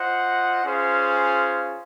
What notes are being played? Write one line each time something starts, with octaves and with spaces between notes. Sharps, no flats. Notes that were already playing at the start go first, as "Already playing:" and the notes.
Already playing: F4 C5 D#5 F#5
C#4 F4 G#4 C5 F5